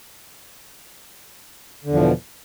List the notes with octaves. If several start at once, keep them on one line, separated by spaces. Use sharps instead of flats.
E2 B2 D3 F3